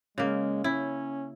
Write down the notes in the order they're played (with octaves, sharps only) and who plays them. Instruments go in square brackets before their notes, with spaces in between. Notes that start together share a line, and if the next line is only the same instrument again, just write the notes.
[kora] C#3 A#3 [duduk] G#3
[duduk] C#4 [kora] E4